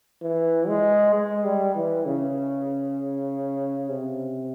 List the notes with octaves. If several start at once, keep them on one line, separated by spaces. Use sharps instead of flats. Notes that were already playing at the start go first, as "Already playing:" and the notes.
E3
G#3
G#3
G3
E3
C#3
C3